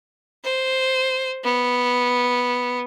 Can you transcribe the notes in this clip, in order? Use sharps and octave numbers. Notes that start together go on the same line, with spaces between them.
C5
B3